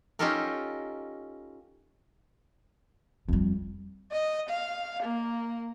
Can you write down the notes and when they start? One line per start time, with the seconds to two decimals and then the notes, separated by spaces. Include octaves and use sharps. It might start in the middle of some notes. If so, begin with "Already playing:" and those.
0.19 C#4 D#4 F4 G4 A4 A#4
3.29 F2 F#3 G3
4.12 D#5
4.49 F5
5.03 A#3